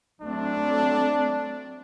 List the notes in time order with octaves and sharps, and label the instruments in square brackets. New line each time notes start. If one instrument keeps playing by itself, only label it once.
[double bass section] F#3 A3 C4 [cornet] D4